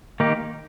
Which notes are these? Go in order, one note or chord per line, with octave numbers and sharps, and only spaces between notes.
D#3 A#3 D#4 G4